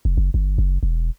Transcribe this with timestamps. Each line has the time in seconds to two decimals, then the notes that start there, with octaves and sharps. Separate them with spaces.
0.05 F1
0.18 F#1
0.34 G1
0.58 F#1
0.83 E1